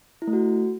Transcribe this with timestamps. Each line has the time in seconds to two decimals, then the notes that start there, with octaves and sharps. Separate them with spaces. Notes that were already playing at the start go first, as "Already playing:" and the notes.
0.22 E4
0.27 A3
0.33 F#4